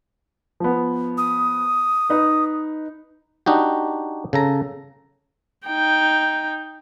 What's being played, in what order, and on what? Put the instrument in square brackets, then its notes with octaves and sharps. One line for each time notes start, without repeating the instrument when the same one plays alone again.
[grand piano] F3 B3
[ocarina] D#6
[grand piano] D#4 B4
[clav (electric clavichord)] D4 D#4 F#4 G4
C#3 A4 A#5
[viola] D#4 G5